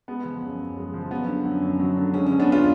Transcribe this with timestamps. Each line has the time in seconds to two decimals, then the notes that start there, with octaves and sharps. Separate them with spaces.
0.08 G#3 B3
0.25 F3
0.42 F#2
0.59 F#2
0.76 G#3
0.93 F3
1.11 F#3 B3
1.28 D3
1.45 F#2
1.62 F#2
1.79 F#3
1.97 D3
2.14 G#3 C#4
2.26 D3 C#4
2.39 B3 D4
2.48 F#2 C#4 F4